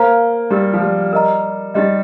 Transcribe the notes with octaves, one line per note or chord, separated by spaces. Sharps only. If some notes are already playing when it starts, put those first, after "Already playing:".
Already playing: A#3 C5 F5 A#5
G3 D#4 G4 A#4
F3
G3
A#4 D#5 A#5
G3 D#4 G4 D#5